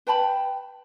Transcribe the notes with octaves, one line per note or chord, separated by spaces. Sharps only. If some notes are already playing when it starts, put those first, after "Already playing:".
B4 G5 A5 B5